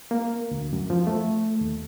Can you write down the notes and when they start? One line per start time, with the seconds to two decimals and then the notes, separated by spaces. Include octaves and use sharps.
0.11 A#3
0.51 D2
0.73 F#2
0.90 F3
1.07 A3
1.61 D#2